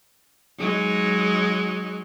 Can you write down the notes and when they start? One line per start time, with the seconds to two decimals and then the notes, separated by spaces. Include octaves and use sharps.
0.58 F#3 G#3 D#4